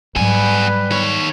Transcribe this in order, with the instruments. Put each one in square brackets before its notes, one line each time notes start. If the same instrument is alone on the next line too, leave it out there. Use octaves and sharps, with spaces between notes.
[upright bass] G#2 F#3 [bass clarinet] G3 [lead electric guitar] B3 G#5 [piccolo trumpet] B4
[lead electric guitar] D#3 C#5